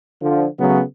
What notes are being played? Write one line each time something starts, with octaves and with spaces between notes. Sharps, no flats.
D3 F3
C#3 F#3 A3 B3